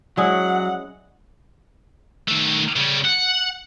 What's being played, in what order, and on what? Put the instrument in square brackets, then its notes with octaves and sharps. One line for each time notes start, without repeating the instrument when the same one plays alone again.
[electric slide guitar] F#3 [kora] G#3 C#4 E4 [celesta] D5 D#6 [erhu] F#5
[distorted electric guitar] D#3 A3
C#3 G3
F#5